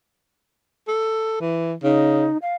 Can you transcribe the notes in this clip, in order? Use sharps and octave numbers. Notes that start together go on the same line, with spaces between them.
A4
E3
C#3 D#4
F5